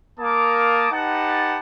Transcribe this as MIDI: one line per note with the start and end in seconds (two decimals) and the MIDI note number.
0.20 0.88 58
0.20 0.88 70
0.20 0.88 77
0.20 0.88 81
0.20 0.88 86
0.20 0.88 87
0.92 1.60 63
0.92 1.60 67
0.92 1.60 71
0.92 1.60 78
0.92 1.60 81